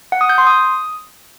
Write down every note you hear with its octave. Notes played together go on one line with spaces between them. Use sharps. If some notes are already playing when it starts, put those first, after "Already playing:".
F#5
D#6
G6
C6
D#6